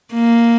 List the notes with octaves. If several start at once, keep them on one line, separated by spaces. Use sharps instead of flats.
A#3